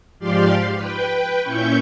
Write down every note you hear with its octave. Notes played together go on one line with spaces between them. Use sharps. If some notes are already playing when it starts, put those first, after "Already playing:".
G#2 F3 G4 D5 F5 C6
B4 G5
A#2 C#4 E4 C#6 G6